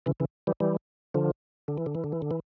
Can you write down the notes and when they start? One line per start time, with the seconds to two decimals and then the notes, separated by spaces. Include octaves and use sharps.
0.06 C#3 E3
0.20 C#3 E3
0.47 E3 G3
0.60 E3 G3
1.14 D3 F3
1.68 D3
1.78 E3
1.86 D3
1.95 E3
2.04 D3
2.12 E3
2.22 D3
2.31 E3